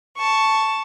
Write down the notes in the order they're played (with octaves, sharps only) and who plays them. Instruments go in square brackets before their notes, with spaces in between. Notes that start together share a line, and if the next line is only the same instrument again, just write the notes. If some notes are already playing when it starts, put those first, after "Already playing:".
[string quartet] A5 C#6